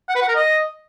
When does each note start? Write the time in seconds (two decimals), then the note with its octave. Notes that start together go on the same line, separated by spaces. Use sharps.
0.09 F#5
0.15 B4
0.22 F#5
0.28 A#4
0.35 D#5